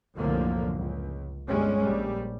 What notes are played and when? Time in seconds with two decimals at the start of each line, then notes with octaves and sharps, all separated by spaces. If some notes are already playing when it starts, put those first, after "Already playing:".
0.18 C2 F#2 A2 D3 F3 A#3
0.75 C#2
1.48 G1 G3 G#3 C#4
1.84 A#1 G3